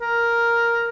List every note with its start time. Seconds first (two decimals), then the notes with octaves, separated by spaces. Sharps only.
0.01 A#4